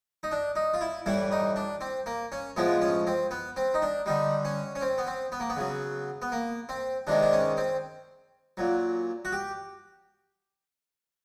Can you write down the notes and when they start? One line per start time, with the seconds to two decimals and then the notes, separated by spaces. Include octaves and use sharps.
0.23 D#4
0.32 D4
0.56 D#4
0.74 F4
0.81 E4
1.06 A2 E3 G3 E4
1.32 D#4
1.56 D4
1.81 C4
2.06 A#3
2.32 C#4
2.56 A2 F3 G#3 B3
2.82 C#4
3.07 C4
3.31 B3
3.57 C4
3.74 D#4
3.82 D4
4.06 D3 G3 D#4
4.45 C#4
4.75 C#4
4.81 C4
4.98 B3
5.07 C4
5.32 B3
5.40 A#3
5.50 B3
5.57 C#3 F#3
6.22 B3
6.32 A#3
6.69 C4
7.07 C3 D#3 G#3 D4
7.22 D4
7.33 C#4
7.57 C4
8.57 A#2 F#3
9.25 F#4
9.32 G4